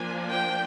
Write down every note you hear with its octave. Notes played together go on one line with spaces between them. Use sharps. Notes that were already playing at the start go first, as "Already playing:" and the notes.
Already playing: F3 A#3 D4 G#5
G5